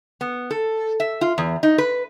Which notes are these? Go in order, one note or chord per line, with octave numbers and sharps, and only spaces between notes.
B3
A4
E5
F4
E2
D#4
B4